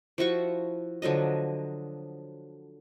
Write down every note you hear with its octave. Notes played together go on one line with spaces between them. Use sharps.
F3 E4 F#4 C#6
D3 F3 F#3 D#5